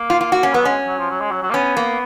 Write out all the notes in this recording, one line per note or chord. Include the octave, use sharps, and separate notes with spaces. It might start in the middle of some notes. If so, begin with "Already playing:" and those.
Already playing: A#3
F4
F4
F#4
C#4
F#3 B3
G#3 C#4
F#3
F3
F#3
G#3
F#3
F#3
A#3
B3 C#4
A#3